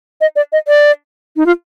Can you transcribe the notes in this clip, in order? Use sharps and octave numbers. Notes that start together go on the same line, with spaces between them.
D#5
D5
D#5
D5
D#4
F4